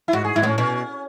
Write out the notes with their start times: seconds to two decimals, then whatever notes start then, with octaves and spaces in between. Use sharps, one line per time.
0.08 E4
0.13 G#2 F#4
0.24 G#4
0.36 G#2 E4
0.42 A2 B3 C#4
0.58 B2 C#4